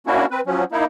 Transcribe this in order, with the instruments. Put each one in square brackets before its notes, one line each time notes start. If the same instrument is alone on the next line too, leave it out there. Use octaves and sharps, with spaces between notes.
[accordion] A#3 C#4 D4 E4 F#4
C4 B4
F3 F#3 C#4
A#3 D#4 E4